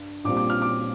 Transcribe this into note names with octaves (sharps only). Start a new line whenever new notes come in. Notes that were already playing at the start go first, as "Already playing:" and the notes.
Already playing: G2
A#1 A#2 G3 C4 D6
D6
F6
D6